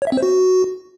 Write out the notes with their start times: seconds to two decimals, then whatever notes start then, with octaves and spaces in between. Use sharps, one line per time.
0.02 C#5
0.07 E5
0.12 C4
0.17 C5
0.23 F#4